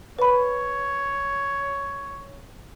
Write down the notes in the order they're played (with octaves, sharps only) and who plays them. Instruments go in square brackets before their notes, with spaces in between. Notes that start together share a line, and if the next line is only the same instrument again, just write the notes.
[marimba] B4 B5 [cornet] C#5